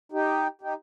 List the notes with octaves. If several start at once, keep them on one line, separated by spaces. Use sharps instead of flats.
D#4 G4
D#4 G4